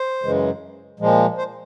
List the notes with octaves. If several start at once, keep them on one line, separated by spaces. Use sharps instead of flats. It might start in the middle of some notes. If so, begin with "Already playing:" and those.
Already playing: C5
F#2 C#3 E3 G#3
A#2 F3 G#3
C5